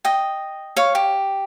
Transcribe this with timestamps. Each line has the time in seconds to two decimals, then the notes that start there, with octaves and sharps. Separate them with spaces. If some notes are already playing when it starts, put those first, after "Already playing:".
0.05 D#5 G5
0.76 C#5 F5
0.95 G4